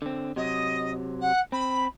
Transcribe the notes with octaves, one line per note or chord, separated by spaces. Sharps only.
D3 C4
C3 F#3 D#5
F#5
C4 B5